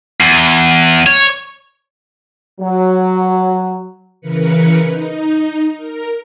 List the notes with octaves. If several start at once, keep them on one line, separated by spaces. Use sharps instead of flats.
E2
C#5
F#3
C#3 E3 A#4 B4 C#7
D#4
A#4